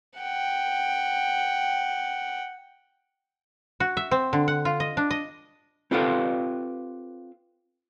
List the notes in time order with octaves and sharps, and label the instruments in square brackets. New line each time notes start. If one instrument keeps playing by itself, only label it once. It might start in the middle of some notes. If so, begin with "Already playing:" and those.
[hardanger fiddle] F#5 G5
[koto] F#4
E5
C4
D3
F#5
F4
D#5
D4
D#5
[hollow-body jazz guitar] C4 F4 G4 A4 B4 F5